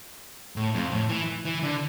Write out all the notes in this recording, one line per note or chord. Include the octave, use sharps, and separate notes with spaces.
A2
F2
A2
E3
E3
D3